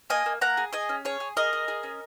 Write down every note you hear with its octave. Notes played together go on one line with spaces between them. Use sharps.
A#3 D#5 G#5
A#3
A#3 F#5 A#5
G#4
G#4 D#5 G#5
C#4
G#4 C#5
G#4
G#4 A#4 D#5
G#4
G#4
C#4